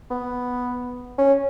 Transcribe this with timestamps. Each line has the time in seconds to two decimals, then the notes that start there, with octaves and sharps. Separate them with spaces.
0.10 B3
1.18 C#4